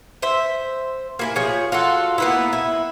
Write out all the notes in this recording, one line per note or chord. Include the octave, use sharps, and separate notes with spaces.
C5 E5
A#3 E4 G#5
F3 G#4 C#5
F4 F#4 A4
A#3 B3 E4
E4